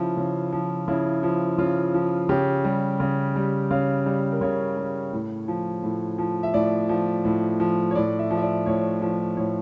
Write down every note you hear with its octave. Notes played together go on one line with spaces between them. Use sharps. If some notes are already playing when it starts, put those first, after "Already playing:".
Already playing: C#3 F3 E4
C#3
F3
C#3 E4
F3
C#3 F4
F3
C#3 G4
G3
C#3
G3
C#3 F5
G3
A#4
C#3 C#5
G3
A2
F3
A2
F3
E5
A2 D5
F3
A2
F3
C#5
A2 D5
E5
F3
E5
D5
A2 C#5
F3
A2 C#5